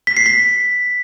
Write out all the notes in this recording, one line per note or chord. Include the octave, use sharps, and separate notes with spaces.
B6
C7
B6